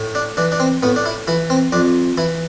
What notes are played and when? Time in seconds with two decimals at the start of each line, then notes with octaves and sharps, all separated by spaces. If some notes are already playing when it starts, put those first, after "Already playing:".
Already playing: A2
0.15 D4
0.37 E3 D4
0.52 D4
0.60 C4
0.82 A2 B3
0.96 D4
1.05 E4
1.27 E3 E4
1.50 C4
1.72 F2 D4
2.17 E3 E4